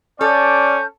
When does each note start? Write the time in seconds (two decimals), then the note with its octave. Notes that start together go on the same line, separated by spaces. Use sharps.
0.21 C#4 A4 C#5 D5 G6